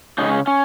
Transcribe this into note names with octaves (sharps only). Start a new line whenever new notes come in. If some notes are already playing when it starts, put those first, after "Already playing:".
C#3 G#3 C#4 D#4
C#4
C#4